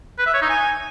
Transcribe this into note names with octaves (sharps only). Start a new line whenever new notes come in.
B4
E5
C#5
D#4
G#5